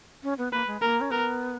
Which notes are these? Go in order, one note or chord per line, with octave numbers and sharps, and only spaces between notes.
C#4
B3
A#3 B4
G#3
A#3 A#4
C#4
B3 A#4